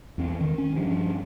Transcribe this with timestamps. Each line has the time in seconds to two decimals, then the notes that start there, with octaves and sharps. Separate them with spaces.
0.18 E2 C4
0.41 D#3
0.58 C#4
0.76 G2 F3